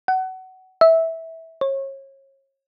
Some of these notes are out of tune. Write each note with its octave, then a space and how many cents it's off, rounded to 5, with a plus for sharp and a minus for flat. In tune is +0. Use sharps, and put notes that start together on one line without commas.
F#5 +25
E5 -15
C#5 -35